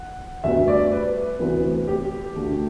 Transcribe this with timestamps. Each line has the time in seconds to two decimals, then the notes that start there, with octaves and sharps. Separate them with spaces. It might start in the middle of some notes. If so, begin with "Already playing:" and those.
Already playing: F#5
0.44 D2 D3 G3 B3 E5
0.68 D5
0.92 B4
1.39 D2 C3 E3 B3
1.88 G4
2.36 D2 D3 A3